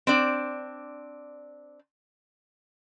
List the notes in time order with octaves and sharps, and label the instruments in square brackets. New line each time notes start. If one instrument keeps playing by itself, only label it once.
[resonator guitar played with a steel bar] C4 D4 D5